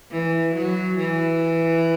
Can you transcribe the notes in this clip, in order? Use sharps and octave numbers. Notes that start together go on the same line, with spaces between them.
E3
F#3
E3